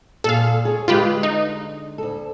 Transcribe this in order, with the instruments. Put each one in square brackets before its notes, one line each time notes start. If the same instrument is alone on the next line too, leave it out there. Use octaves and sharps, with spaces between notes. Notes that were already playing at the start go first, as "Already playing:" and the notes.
[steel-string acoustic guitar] A#2 G#4 [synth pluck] A4 F5
[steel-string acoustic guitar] G#4 C#5
[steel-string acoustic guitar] D3 G#3 [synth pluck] F4 G4 B4
[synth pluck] D#4
[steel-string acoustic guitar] D2 A4